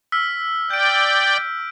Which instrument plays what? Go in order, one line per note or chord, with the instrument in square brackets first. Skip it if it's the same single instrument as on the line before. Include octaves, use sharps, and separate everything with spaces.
[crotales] E6 F6 B6
[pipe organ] D5 G5 [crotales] G6 D7